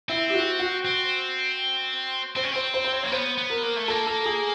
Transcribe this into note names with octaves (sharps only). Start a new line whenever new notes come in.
C4 E4
G4
F#4
F#4
C4
C4 C5
C#4
C4 C5
C5
C5
C#5
A#3 C#5
B3 C5
B3
A#4
A#3
A3
A#3 A4
A4
G#4